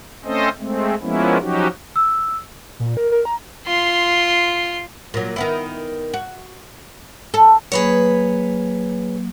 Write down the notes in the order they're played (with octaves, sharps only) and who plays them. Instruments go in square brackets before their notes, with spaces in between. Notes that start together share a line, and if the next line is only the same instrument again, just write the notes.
[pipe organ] A3 C4 C#4 A4 C5 D#5
G#3 A3 C4
F3 G#3 A#3 B3 C#4 E4
F3 F#3 C#4 D#4 F#4 G4
[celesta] E6
[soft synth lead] A#2
A#4
A#4
A#5
[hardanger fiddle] F4 C6
[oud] A#2 F#3
D#3 B3 E4
F#4
A4
[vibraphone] F#3 A#3 [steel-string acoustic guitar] G#4 B4 C#5